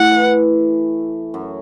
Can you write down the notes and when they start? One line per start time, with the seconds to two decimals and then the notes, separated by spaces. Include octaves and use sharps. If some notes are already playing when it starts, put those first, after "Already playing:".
Already playing: A2 A3 F#5
0.10 E3
1.34 F#2 F#3